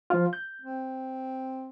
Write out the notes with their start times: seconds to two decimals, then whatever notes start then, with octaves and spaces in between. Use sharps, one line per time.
0.10 F3 F4
0.33 G6
0.62 C4